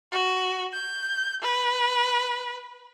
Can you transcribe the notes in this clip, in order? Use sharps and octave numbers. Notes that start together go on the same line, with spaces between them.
F#4
G6
B4